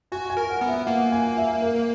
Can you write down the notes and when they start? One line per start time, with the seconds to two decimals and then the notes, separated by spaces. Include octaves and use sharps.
0.12 F#4 G#5
0.30 G#5
0.37 A#4
0.50 F#5
0.61 B3
0.68 E5
0.86 A#3 F#5
1.12 G#5
1.37 E5
1.62 A#4